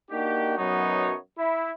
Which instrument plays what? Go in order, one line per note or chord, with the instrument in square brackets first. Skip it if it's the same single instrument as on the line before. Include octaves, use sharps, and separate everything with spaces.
[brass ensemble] A#3 D4 D#4 F#4 G4
F#2 B2 F#3 B3 D#4 C#5
E4